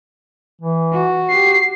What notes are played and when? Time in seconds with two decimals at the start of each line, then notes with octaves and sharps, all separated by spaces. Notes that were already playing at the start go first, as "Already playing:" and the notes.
0.61 E3
0.93 F#4
1.30 G4 C7